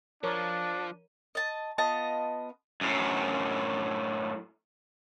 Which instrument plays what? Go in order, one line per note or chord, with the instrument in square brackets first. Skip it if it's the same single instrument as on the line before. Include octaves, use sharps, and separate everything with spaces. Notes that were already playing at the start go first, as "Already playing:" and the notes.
[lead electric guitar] F3 [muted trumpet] D4 [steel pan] A#4 C#5
[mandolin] D#5 A5
B3 F4 D#5 A5
[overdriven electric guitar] F#2 A2